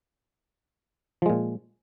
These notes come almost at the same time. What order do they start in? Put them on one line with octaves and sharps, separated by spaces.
F3 G#3 A#2